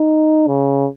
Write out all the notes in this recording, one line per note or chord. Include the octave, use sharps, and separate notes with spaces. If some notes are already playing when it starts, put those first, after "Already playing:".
Already playing: D#4
C#3